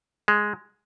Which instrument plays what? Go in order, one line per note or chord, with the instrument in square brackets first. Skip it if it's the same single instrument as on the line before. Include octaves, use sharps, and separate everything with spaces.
[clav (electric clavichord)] G#3